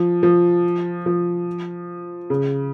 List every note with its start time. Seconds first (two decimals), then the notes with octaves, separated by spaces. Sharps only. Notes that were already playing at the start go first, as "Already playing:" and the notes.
Already playing: F3
0.23 F3
1.06 F3
2.30 C#3